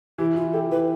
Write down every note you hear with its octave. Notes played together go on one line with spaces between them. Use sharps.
E3 G4
E3 F4
G4 A4
E3 B4